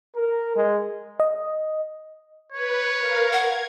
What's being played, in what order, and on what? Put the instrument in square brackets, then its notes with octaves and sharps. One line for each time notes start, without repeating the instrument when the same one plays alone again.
[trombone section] A#4
G#3
[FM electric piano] D#5
[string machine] B4 [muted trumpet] C#5
[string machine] A#4 F5
[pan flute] F#5 [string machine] G#6